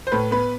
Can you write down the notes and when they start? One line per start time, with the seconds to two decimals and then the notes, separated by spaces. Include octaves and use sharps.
0.07 C5
0.12 A2 B4
0.31 B3 B4